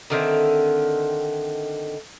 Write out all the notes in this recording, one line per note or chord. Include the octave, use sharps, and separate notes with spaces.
D3 D#3 C4 E5